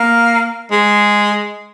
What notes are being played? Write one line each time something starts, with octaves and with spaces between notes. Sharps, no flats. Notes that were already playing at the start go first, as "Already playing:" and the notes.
Already playing: A#3
G#3